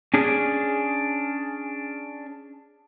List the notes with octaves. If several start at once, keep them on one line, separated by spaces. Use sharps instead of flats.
C#4 D4 G#4 C#5